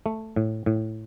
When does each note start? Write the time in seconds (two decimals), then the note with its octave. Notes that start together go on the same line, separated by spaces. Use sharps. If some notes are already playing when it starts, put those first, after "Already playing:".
0.06 A3
0.36 A2
0.66 A2